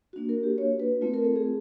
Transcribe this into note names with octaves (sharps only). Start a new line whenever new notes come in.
A#3 D4 F#4
A#4
G4
C#5
B4
A3 C4 F4
A#4
A4
G#4